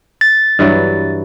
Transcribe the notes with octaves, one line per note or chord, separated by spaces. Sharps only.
A6
G2 E3 F#3